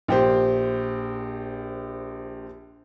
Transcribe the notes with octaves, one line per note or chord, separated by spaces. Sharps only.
A#1 G4 C5